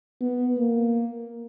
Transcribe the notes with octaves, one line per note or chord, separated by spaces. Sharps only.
B3
A#3